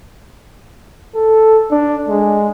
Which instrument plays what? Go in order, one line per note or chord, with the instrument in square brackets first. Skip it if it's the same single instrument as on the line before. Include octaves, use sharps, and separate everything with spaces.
[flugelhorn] A4
D4
G#3